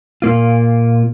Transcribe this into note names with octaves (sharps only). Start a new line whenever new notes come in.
A#2 A#3 F4